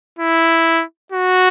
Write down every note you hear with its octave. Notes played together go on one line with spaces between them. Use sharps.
E4
F#4